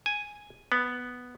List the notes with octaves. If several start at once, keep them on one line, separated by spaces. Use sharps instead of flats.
G#5
B3